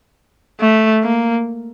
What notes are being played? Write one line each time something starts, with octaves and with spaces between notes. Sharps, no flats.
A3
A#3